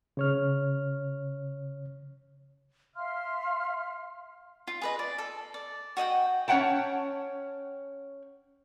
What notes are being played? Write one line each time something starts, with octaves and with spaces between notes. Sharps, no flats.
C#3 C#5 F6
E5 F5 C6 F6
F4
G#4 B4 D#5
D5
A4
D5
F#4 D#5 F#5 G5
C#4 C#5 D5 F#5 G5 A5